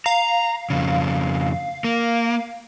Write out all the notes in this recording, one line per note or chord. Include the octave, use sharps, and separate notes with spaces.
F5 A#5
F2 C#3
A#3